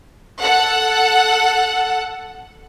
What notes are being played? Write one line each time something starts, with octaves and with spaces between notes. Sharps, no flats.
A4 F#5